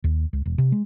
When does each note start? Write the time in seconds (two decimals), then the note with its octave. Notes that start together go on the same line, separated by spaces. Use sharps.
0.04 D#2
0.33 C#2
0.46 E1
0.58 C3
0.72 G#3